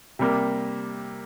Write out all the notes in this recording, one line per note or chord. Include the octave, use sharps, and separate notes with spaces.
C3 G3 A#3